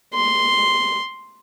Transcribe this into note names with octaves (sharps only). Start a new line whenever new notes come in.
C6